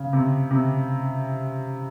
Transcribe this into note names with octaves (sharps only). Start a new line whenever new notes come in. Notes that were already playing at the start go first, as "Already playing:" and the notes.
Already playing: C#3
C3
C3